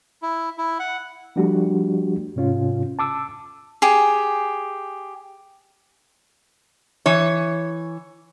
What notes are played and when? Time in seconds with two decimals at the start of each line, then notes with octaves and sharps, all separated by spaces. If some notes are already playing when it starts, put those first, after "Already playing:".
0.22 E4
0.58 E4
0.80 F#5
1.36 F3 G3 A3 D4 F#4 G4
2.36 G#2 C3 C#4 F4
2.99 A5 D6 E6
3.82 G4 G#4
7.06 E3 C#5